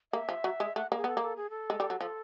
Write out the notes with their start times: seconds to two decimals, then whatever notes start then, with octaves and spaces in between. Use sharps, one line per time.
0.13 A#3 E5
0.29 F3
0.44 F#3
0.60 G#3
0.76 A3 F#5
0.92 A#3
0.97 G#4
1.04 B3 A4
1.17 A#3
1.23 A4
1.36 G#4
1.50 A4
1.70 G#3
1.80 G3
1.90 F#3
2.00 F3 A4